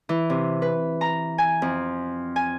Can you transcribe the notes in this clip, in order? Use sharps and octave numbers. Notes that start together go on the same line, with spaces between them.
E3
C3
B4
A#5
G#5
F2
G#5